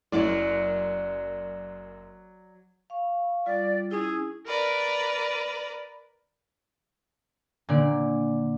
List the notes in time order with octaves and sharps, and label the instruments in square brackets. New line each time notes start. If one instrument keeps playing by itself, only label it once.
[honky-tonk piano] F#1 F#2 [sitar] F#3 D5 [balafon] E4
[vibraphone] F5 C#6
[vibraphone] G3 F4 [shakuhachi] D5
[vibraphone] C#4 E4 [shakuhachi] G#4
[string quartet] A#4 B4 D5
[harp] A#2 D3 D5